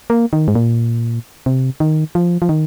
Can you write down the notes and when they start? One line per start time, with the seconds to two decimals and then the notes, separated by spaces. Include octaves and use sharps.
0.10 A#3
0.33 D#3
0.48 G#2
0.55 A#2
1.46 C3
1.80 D#3
2.15 F3
2.42 F3
2.49 D#3